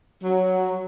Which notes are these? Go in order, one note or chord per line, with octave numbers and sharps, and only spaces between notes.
F#3